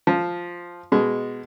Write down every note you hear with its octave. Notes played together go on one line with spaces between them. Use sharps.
F3
B2 G#3